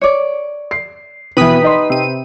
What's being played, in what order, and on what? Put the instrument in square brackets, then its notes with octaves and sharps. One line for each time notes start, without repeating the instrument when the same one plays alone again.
[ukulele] C#5 D5
[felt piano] C7
[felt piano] B2 E3 [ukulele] G4 [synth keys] B4 D#6 B6
[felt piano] D#4 D#5 C6
[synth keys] C3 D#7